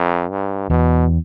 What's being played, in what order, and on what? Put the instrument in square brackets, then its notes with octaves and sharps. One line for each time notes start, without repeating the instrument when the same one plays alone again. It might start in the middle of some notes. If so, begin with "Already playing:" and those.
Already playing: [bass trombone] F2
G2
[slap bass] E2 [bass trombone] B2